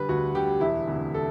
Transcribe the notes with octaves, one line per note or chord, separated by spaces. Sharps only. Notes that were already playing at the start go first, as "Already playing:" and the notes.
Already playing: D3 G3 B4
D2 F#4
D3 G3 G4
E1 E4
D2 C3
A4